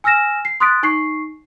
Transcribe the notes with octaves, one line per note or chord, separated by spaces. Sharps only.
G#5 E6 F6 A#6 E7
C7
C6 D#6 F#6 A6 B6 D7
D#4 C#6 C7